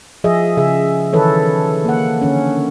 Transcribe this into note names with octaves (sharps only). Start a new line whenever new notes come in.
F3 G#4 D#5 E5
C#3 G#4 E5
D#3 E3 A4 B4 C#5
A#3 F#5
D3 C#4